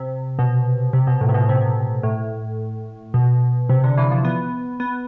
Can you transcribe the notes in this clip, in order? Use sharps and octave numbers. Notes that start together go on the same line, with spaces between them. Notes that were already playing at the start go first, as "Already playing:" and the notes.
Already playing: C3
B2
C3
B2
A2
C3
B2
C3
A2
B2
C3
D3
E3
F3
B3
B3